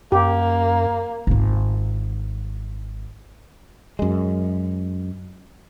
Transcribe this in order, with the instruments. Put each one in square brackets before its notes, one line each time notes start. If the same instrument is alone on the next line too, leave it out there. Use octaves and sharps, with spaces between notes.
[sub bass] F#2 [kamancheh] A#3 [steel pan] G4
[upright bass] G#1 F4
[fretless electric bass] F#2 G#3